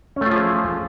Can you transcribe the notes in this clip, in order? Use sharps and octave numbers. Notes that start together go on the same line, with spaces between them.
F3 A3 C#4 F4 G#4